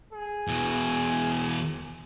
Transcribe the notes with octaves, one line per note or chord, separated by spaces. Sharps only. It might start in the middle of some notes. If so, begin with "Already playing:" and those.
G#4
E2 B2